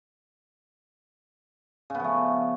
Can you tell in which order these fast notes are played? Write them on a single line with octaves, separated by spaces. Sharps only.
C#3 B3 F3 A3